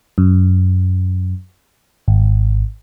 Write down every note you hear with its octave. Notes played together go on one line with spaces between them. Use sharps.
F#2
G#1